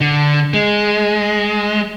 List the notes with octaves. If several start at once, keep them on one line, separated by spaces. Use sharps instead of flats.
D3
G#3